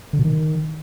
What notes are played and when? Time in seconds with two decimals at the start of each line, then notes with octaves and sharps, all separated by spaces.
0.13 D3
0.19 B2
0.25 D#3